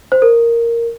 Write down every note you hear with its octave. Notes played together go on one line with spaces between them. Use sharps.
C5
A#4